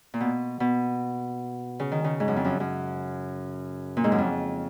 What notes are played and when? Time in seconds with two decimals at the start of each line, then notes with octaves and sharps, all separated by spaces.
0.14 A#2
0.20 B2
0.60 B2
1.80 C#3
1.92 D#3
2.04 C#3
2.20 G#2
2.28 F#2
2.36 F2
2.45 F#2
2.60 F#2
3.97 A#2
4.04 G#2
4.12 F#2
4.18 F2